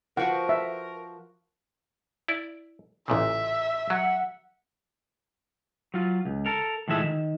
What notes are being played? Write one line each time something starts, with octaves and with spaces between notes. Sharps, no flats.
F3 F#4 A#4 B4 F#5
E5
E4 D5
A1 A#2 C#3 E5
F#3 F#5
F#3 F4
C#2
A4 A#4
A2 D#3 F3 G#3 E5
D#3